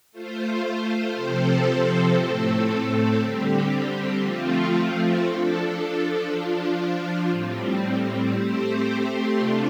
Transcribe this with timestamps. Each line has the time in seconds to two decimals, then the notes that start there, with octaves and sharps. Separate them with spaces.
0.12 A3 F4 C5
1.14 C3 F3 C4 A4 C5
2.17 A2 A3 C4 A4
3.19 D3 G3 C4 G4
4.22 F3 A3 C4 F4
5.24 F3 D4 A4
6.27 F3 D4 F4
7.29 A2 G3 C4
8.32 A3 C4 G4 C5
9.34 C3 A3 D4 F4